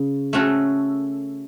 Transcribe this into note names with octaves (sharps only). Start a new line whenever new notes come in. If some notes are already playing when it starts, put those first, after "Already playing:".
Already playing: C#3
A3 C#4 F#4 A4